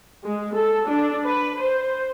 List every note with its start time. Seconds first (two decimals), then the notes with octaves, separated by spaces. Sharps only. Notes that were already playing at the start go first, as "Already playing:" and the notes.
0.24 G#3
0.54 A4
0.89 D4
1.25 B4
1.61 C5